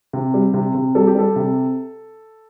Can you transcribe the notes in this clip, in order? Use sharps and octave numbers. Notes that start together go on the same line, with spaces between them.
C3
G3
C3
C3
G3 A4
G4
G3 A4
C3